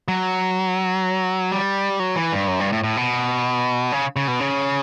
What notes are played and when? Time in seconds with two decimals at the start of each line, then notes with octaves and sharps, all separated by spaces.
0.08 F#3
1.52 G3
2.00 F#3
2.16 E3
2.33 G2
2.48 F#2
2.60 G2
2.72 A2
2.84 A2
2.97 B2
3.92 C#3
4.16 C#3
4.28 B2
4.40 C#3